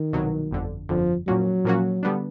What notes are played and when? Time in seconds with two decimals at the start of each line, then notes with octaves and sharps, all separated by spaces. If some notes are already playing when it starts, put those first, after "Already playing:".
Already playing: D#3
0.13 C2 B2 F#3
0.51 G1 F2 D3
0.89 G1 F2 D3 F3
1.27 A#2 F3 F#3 A#3 C#4 F#4
1.65 A#2 F3 A#3 C#4 F#4
2.03 D3 G3 B3 D4